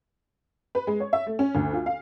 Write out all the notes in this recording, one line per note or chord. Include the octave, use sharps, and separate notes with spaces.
B4
G#3
C#5
E5
A3
C#4
D2
F4
F5